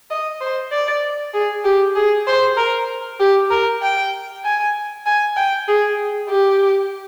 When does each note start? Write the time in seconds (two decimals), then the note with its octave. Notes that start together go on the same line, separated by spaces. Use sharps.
0.10 D#5
0.41 C5
0.71 D5
1.34 G#4
1.64 G4
1.96 G#4
2.27 C5
2.57 A#4
3.20 G4
3.51 A#4
3.82 G5
4.44 G#5
5.06 G#5
5.36 G5
5.68 G#4
6.29 G4